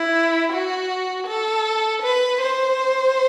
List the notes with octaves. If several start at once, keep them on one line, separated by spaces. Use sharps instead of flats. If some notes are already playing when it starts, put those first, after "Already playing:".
Already playing: E4
F#4
A4
B4
C5